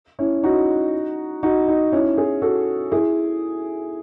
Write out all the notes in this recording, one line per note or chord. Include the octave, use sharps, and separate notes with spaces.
C#4 E4
D#4 F#4
D#4 F#4
D#4
C#4 E4
E4 G#4
F#4 A4
E4 G#4